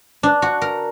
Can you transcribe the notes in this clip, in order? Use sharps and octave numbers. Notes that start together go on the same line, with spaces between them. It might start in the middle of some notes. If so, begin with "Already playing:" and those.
D4
F#4
A#4